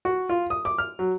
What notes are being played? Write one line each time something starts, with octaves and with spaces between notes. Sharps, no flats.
F#4
F4
D#6
D6
F6
F#3